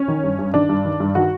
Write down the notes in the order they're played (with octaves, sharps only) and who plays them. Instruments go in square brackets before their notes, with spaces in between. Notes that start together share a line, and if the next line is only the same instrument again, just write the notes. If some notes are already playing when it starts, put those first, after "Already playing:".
Already playing: [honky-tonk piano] C#4
D#3
G2
G2
D#3 D4
G2
D#3
G2
D#3 F#4